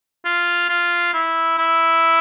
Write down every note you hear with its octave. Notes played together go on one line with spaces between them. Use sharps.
F4
F4
E4
E4